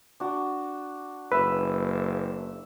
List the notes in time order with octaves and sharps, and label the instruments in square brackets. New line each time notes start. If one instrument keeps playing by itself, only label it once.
[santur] D4 F#4
[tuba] F#1 [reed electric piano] B4 [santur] E5